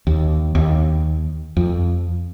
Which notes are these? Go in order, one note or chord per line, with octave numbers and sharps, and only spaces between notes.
D#2
D#2
F2